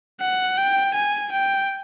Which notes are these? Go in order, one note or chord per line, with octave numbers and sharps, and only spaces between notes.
F#5
G5
G#5
G5